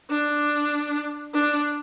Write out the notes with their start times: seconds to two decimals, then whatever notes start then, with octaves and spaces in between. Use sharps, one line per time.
0.10 D4
1.34 D4